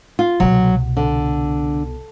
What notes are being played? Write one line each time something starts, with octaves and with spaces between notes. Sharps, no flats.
F4
C2 B2 F#3
D3